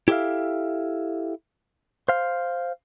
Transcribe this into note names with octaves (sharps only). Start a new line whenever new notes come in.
E4 G4 A4 C5 E5 F5
C5 F5